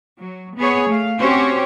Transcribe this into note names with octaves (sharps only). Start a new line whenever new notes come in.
F#3
B3 G#4 C#5
A3 F5
C4 C#4 F#4 G4 C5 C#5